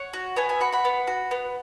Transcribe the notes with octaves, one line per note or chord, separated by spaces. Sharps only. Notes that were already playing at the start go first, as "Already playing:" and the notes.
Already playing: C#5 F#5
F#4
B3 E5 G#5
E5 G#5
F#4 F#5 B5
F#5 B5
B3
F#4
B3